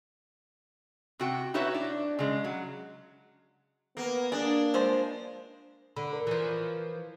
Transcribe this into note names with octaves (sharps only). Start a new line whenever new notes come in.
C3 F#4 G5
D#4 E4 F#4 B4 C#5 E5
D4
C#3 G#3
F#3
A#3 B3
A#3 D4 G#4
F3 G#3 C5
D3 B5
A#4
E3 F3